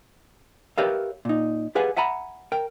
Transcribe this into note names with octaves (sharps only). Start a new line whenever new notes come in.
G4 A#4 B4 C#5 E5 F5
A#2 D#4
G4 G#4 B4 F5 F#5 G#5
E5 F#5 G#5 A#5 B5
A#4 G5